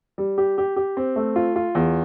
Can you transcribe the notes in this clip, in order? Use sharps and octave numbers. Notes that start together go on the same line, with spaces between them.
G3
G4
G4
G4
C4
A3
F4
F4
E2